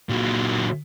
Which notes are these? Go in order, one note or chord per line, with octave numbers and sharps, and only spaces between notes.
A#2 F#3